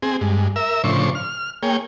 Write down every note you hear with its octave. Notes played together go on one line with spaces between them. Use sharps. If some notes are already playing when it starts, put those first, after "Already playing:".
C4 G#4
G2 G#3
A#4 E5 E6
A2 C#3 F3 D4 C5 C#6
F6
A#3 G#4 C#5 G5